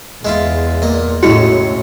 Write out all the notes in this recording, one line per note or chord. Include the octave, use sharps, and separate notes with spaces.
E2 G#3 E4 F4
A#2 D#5
A2 C#3 F#3 G#3 E4 F#4 C#7